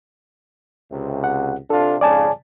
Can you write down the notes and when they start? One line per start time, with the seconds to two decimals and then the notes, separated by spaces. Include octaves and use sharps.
0.91 C#2 C3
1.24 F#5
1.70 C3 D4 F4 A4
2.01 F2 G#2 C#3 D5 G#5 A5